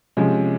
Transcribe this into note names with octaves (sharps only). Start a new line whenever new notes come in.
C3 F3 G#3 C#4